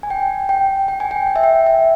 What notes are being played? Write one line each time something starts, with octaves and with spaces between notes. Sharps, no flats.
G#5
G5
G5
G5
G#5
G5
G5
E5
G5
E5